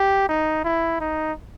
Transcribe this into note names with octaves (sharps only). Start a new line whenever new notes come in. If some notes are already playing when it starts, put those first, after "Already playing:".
Already playing: G4
D#4
E4
D#4